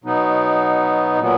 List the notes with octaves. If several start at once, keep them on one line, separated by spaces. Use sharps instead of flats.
B2 F#3 B3 D#4
A#2 F#3 B3